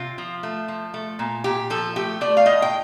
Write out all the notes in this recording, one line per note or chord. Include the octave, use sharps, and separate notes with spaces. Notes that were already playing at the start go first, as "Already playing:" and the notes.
Already playing: C3 F4
F3
A3
F3
A3
A#2
A#2 G4
F3 A4
A3 G4
A3 D5
F5
A2 D#5
G5